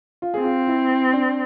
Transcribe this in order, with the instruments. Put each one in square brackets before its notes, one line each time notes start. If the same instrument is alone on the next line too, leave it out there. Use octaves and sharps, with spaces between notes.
[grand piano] F4
[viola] C4 [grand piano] G#4
[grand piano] F4
E4
D4